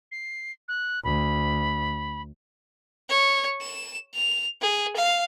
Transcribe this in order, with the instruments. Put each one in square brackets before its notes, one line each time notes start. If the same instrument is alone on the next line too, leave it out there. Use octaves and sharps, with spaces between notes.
[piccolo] C7
F#6
[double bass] D2 [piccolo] B5
[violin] C#5
E7
F7
G#4
F5